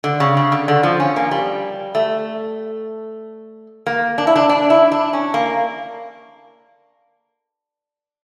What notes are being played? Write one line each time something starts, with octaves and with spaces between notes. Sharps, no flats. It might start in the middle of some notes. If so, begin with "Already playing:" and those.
D3
C#3
C#3
D3
D3
F3
C#4
A#3
G3
A3
A#3
D4
E4
D4
D4
E4
D4
C#4
A#3